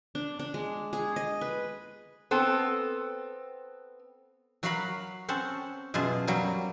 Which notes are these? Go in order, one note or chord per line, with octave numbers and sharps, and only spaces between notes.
D4
D4
G#3
G#4
D#5
B4
B3 C4 A4
F#3 F#4 A#4 F5 F#5 B5
C4 C#4 F#5 A5
F#2 B2 F4 G#4 G#5 A5
F#3 G3 A#3